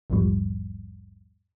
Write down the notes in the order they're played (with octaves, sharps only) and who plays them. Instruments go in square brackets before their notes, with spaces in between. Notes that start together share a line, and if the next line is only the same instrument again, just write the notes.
[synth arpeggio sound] A#1 E2 G#2 B2 F3 G3